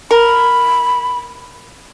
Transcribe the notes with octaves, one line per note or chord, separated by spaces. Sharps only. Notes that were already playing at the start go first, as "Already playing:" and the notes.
A#4 B5